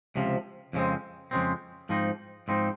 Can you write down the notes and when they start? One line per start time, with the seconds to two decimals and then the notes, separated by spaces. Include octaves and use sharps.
0.16 C#2 C3 F3
0.73 F2 C#3 G#3 C4
1.31 F2 C#3 G#3 C4
1.89 G#2 F3 C4 D#4
2.48 G#2 F3 C4 D#4